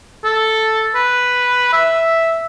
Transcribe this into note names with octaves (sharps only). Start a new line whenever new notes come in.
A4
B4
E5